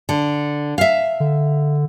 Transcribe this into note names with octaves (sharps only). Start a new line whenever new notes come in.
D3
E5 F5
D3